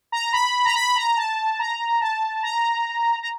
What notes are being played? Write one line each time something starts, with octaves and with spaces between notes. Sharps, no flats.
A#5
B5
A#5
B5
A#5
A5
A#5
A5
A#5
A#5